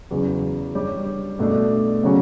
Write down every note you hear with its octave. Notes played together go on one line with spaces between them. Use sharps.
E2 C#3 F#3
G3 D4 G4 C#5
B2 A3 D4
C#3 F#3 C#4 F#4